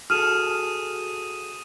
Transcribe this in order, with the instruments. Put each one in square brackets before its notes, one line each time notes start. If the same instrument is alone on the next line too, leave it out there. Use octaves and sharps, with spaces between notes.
[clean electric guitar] F#4 G#4 A4 [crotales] D#6 D#7 E7 [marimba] F6